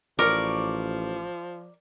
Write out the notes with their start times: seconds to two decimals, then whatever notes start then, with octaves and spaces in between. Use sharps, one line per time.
0.19 A1 F3 A#4 D5 C#6